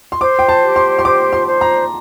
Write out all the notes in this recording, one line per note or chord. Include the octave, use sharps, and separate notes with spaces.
C6
C5 D6
G5
A5
G4
C6
C6
C5 D6
C6
C5
A#5